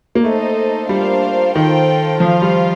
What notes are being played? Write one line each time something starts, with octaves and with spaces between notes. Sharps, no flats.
A#3
A3 D#4 A4 C5 D#5
G3 A#3 D4 F4 C5 F5
D#3 F4 A4 C5 G5
F3 F4 C5 F5
G3